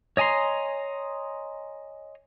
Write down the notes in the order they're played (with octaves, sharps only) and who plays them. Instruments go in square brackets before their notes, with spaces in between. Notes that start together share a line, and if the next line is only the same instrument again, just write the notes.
[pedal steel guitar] C#5 D#5 G#5 A#5 C6